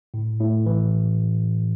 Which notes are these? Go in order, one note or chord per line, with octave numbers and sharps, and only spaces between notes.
A2
A2
E3